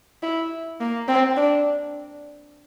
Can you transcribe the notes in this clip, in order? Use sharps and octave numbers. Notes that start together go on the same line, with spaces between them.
E4
A#3
C4
D4